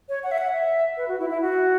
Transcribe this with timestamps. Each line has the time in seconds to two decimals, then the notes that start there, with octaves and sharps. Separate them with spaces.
0.09 C#5
0.23 F#5
0.31 E5
0.38 F#5
0.53 E5
0.97 B4
1.08 F#4
1.19 E4
1.30 E4
1.42 F#4